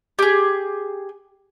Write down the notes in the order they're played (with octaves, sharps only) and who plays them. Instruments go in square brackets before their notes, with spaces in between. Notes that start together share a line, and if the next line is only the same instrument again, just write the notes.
[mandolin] G4 G#4